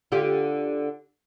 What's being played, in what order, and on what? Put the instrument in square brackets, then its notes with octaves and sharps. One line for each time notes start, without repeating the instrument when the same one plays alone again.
[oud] D3 F4 G4